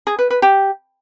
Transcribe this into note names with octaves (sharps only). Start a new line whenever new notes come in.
G#4
B4
B4
G4